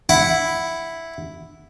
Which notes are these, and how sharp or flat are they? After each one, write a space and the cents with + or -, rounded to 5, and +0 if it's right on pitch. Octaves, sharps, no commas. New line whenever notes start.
E4 +0 F#5 +0